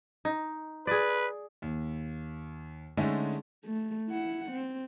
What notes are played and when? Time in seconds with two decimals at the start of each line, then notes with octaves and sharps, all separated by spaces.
0.25 D#4
0.87 G#4 B4 D5
1.62 D#2
2.97 D3 G#3 A3 C#4 D#4 A4
3.65 A3
4.09 E4 F#5
4.51 C4